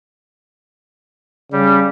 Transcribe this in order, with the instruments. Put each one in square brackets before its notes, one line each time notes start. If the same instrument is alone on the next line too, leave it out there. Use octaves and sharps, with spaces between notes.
[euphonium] C#3 [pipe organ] G3